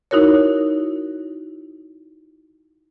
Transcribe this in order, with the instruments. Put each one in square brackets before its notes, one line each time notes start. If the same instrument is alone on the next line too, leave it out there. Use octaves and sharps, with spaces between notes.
[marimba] D#4 E4 F#4 A#4 C#5